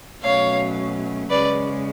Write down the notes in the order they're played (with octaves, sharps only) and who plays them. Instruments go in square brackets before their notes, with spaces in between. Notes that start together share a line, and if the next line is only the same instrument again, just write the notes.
[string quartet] B2 F#3 A3 C#4 C#5 F5
C#3 G#3 C#4 B4 D5